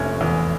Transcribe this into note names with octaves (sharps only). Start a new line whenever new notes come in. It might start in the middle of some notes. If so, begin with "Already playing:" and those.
Already playing: F1 C3 C#4
E2